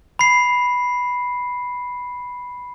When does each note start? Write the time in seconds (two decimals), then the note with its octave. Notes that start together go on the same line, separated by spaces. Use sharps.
0.19 B5 C7